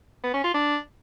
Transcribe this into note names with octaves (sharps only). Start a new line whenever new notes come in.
B3
C#4
F4
D4